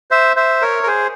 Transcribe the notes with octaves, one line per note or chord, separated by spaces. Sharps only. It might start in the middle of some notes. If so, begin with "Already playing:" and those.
C5 E5
C5 E5
A#4 C#5
A#4
G#4 C5